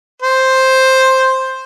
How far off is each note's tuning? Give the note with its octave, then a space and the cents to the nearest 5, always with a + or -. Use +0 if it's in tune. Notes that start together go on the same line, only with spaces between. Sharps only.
C5 +5